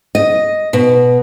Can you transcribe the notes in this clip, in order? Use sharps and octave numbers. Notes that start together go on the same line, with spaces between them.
D#5
B2